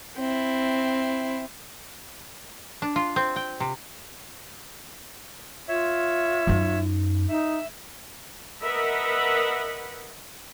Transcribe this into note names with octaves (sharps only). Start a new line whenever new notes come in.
C4 E4
D4
F4
C4
G5
C3
F4 C#5 E5
F#2 D#4
D#4 E5
A#4 B4 D#5 E5 F#5 B5